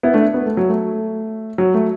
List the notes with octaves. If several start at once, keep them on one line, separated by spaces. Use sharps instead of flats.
B3 E4
A3 D4
B3
A3
F#3
A3
F#3
A3